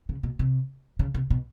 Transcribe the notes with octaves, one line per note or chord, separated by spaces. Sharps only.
C#3
B2
C3
C#3
C3
B2